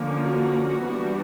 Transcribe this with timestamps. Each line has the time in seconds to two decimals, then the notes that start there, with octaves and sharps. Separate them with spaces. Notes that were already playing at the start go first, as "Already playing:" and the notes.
Already playing: D3 F3 A#3 C#4
0.22 F#4
0.82 E3 G3 B3 D4